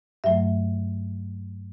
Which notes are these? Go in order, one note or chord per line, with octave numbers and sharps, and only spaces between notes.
G2 F#3 A3 E5